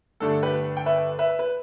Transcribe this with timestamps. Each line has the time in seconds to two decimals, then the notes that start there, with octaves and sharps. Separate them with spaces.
0.20 G2 D3 A3 D4 A4
0.43 G4 B4
0.77 G5
0.86 B4 E5
1.19 B4 E5
1.39 B4